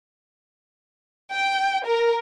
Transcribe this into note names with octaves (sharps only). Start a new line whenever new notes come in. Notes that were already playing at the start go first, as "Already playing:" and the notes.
G5
A#4